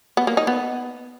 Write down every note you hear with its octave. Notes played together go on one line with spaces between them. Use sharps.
B3
A#3
D#4
B3